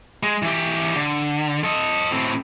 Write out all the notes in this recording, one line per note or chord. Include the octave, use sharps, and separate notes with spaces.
G#3
E3 G4
D3
A4 D#5
A2 C4